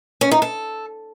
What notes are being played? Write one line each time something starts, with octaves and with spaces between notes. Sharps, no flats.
C#4
D#4
A4